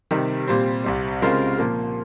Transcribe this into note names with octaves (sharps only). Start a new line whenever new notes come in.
C3 D#3 G3
A#2 G3 C4
C2 C3 G3
C#3 G#3 C4 F4 A#4
A#2 F3 A#3